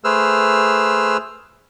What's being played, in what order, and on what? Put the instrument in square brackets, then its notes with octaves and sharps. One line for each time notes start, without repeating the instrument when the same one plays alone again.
[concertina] A3 G#4 B4 C5 E6 F6